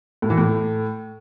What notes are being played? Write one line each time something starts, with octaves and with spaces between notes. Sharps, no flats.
A2
E3
A2